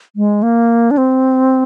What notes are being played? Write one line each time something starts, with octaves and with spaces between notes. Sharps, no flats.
G#3
A#3
D4
C4